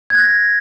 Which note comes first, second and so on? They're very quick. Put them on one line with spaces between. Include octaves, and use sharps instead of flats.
G#6 F#6 A#6